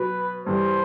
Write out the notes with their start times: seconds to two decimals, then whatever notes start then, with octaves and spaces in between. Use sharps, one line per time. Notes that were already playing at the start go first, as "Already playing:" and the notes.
Already playing: B2 F#3 B4
0.46 G2 E3 G3 C5